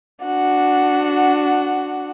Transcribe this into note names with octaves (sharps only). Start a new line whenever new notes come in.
D4 F#4 F#5